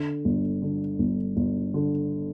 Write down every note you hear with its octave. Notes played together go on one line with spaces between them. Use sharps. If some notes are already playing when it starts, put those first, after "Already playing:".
Already playing: D3
G1
D3
G1
G1
D3